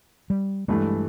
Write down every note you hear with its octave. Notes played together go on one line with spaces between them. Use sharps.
G3
G2 E3 G#3 A3